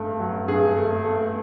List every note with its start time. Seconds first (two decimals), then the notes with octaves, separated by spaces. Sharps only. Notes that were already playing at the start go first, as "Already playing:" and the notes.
Already playing: G2 A3
0.20 F#3
0.48 G2 G#4
0.76 A3
1.04 A3